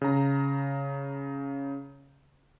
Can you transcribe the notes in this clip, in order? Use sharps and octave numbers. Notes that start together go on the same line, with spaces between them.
C#3 A#5